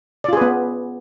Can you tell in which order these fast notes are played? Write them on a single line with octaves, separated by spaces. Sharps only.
D5 F4 G#4 B4 B3